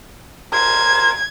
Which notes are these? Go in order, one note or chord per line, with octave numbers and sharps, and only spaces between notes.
A#4 C5 G#6